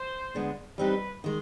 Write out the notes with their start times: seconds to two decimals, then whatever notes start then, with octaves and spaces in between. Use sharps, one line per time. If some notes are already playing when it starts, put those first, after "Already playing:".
Already playing: C5
0.35 D3 G#3 B3 D4
0.78 G3 C4 D#4 G4 B4
1.24 D#3 G#3